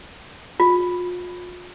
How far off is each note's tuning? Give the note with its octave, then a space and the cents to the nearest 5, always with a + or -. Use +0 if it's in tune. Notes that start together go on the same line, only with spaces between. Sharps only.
F4 +35